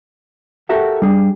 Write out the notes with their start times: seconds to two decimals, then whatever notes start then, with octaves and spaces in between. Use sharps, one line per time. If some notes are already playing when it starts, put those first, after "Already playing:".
0.69 F#4 G4 A4 A#4 E5 F#5
1.02 G3 D4 G#4